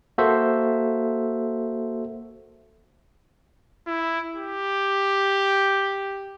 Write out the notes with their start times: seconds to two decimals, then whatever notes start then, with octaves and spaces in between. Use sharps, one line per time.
0.18 A#3 F#4 A4 C5 E5
3.87 E4
4.36 G4